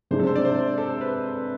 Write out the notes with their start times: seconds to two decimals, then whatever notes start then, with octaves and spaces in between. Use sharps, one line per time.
0.11 C3 G#3 D4 C5
0.20 A4
0.27 C5
0.36 D5
0.45 C5
0.78 A4
0.90 C5
1.01 B4